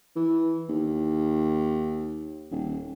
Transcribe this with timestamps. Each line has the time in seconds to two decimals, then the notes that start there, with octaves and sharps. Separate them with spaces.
0.16 E3
0.69 D#2
2.51 D#1